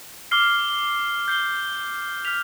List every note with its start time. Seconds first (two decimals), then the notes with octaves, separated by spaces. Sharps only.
0.31 D6 F6 C7 G7
1.28 G6 C7 G7
2.25 F6 B6 F7